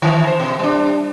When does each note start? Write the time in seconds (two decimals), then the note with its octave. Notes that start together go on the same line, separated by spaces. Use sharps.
0.02 D#3 E3
0.27 C5
0.40 B2
0.59 G3 D4